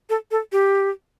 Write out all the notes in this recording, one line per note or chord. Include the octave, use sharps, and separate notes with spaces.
A4
A4
G4